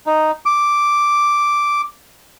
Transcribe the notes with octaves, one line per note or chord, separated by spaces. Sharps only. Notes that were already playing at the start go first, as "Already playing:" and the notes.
D#4
D6